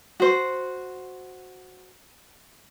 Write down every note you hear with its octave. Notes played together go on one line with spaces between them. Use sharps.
F#4 C5